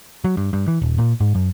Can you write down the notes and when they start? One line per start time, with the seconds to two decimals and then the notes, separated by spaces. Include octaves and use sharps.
0.24 F#3
0.37 G2
0.53 G2
0.68 E3
0.82 D#1
0.98 A#2
1.21 G#2
1.35 F#2